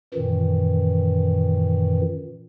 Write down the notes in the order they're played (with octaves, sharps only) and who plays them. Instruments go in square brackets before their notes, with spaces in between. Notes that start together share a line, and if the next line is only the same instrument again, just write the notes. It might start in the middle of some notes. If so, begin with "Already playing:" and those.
[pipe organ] F#2 A#2 D#3 E3